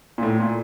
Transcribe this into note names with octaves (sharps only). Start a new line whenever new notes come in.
A#2
A2
A#2